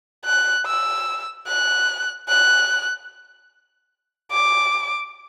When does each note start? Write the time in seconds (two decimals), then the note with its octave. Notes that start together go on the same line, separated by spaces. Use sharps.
0.25 F#6
0.66 E6
1.48 F#6
2.29 F#6
4.32 D6